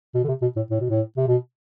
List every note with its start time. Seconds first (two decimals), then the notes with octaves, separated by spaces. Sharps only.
0.15 B2
0.24 D3
0.28 C3
0.42 B2
0.56 A2
0.71 A2
0.81 B2
0.90 A2
1.17 C3
1.28 B2